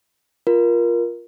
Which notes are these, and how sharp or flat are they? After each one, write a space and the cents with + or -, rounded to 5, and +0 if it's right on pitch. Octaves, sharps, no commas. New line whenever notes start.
F4 +0 A#4 +15